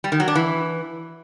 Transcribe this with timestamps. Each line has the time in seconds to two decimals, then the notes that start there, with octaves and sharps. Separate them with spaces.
0.04 G3
0.12 D#3
0.20 F#3
0.28 D4
0.35 E3